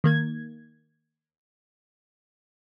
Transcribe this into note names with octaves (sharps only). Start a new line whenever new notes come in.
D#3 A#3 G#6